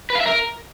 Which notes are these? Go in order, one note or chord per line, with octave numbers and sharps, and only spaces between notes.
B4
F5
E5
A#4